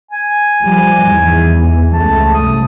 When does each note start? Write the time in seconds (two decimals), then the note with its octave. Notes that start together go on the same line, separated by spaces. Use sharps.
0.11 G#5
0.62 F3 G3
1.01 E2 G#2 E3
1.93 C#2 A3 A5
2.34 C2 F#2 D#6